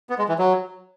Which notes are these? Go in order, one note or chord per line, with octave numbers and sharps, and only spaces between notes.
B3
G#3
E3
F#3